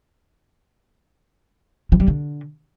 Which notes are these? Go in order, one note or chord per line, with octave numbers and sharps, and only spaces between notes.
F3
G3
D3